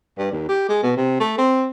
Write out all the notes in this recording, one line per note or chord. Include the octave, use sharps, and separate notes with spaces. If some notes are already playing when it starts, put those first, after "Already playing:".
G2
D#2
G4
G#3
B2
C3
A3
C4